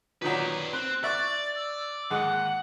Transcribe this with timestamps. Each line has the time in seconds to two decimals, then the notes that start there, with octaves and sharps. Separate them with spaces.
0.22 A#2 D#3 F#3 B4 D5
0.73 C4 C5 F#6
1.04 D5 E5 C#6 F#6 A6
1.56 E6
2.10 D#2 G#2 G#3 F#5